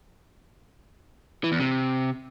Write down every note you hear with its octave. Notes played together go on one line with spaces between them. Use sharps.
E3
E2
C3